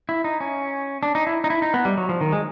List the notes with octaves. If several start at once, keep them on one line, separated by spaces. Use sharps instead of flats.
E4
D#4
C#4
D4
D#4
E4
D#4
E4
D#4
B3
G3
F#3
F3
D#3
G#3